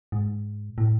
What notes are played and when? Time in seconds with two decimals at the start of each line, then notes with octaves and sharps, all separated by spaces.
0.12 G#2
0.78 A2